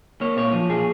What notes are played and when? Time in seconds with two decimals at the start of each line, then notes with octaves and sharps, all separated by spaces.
0.21 A#3 C#5
0.37 A#2 C#5
0.53 F3
0.69 A#2 G#4